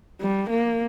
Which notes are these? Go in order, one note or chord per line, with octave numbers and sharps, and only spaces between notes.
G3
A#3